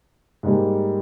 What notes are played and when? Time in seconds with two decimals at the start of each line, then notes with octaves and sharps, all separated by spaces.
0.43 G#2 G3 A#3